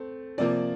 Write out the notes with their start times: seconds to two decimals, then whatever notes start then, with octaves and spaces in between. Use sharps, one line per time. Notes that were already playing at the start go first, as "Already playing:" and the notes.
Already playing: A3 C4
0.38 C3 F3 A#3 D5